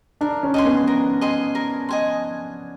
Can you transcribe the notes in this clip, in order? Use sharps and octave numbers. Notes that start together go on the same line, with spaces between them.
D4 A#4
C#4
D#5 G#5 C6
B3
A#4
D#5 G#5 C6
A#4
D#5 G#5 C6